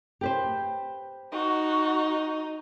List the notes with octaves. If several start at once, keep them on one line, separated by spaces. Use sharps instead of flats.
G4 B4 C5
D#4 F#4